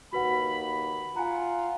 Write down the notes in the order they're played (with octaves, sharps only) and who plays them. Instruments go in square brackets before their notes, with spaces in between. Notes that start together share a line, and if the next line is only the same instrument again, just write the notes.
[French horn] D#2 [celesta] F#4 B4 F#5 [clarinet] B5
[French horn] F4 [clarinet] F#5 [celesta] G#5 A#5